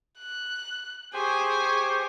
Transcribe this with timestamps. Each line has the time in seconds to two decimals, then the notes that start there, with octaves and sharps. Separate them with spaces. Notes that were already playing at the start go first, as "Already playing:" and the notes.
0.18 F#6
1.14 G4 G#4 C5 G#5 C#6